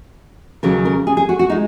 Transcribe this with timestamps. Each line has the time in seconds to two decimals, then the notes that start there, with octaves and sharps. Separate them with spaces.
0.63 D#2 C#3 F#3 A#4
0.85 A#4
1.07 G#4
1.17 G#4
1.29 F#4
1.39 F#4
1.50 G#3 D#4